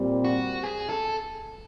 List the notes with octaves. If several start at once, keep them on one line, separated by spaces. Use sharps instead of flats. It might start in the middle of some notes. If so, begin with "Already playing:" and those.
Already playing: A#2 G3 C4
F#4
G#4
A4